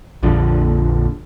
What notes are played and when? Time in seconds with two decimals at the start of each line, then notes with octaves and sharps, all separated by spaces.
0.23 A#1 F2 D3 F3